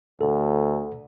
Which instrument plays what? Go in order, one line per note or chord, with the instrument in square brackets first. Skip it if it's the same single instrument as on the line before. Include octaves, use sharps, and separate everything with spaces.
[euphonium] D2 [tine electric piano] A4